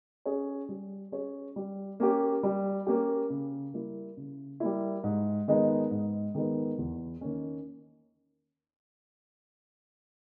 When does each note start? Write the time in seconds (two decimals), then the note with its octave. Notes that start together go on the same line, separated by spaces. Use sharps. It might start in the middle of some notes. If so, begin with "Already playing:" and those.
0.26 C#4 G#4 C#5
0.69 G3
1.12 C#4 G#4 C#5
1.56 G3
2.00 A#3 C#4 G4
2.43 G3
2.87 A#3 C#4 G4
3.30 C#3
3.74 G3 A#3 E4
4.17 C#3
4.60 G3 A#3 E4
5.04 G#2
5.48 D#3 G#3 B3 D#4
5.91 G#2
6.35 D#3 G#3 B3 D#4
6.78 E2
7.21 D#3 A#3 C#4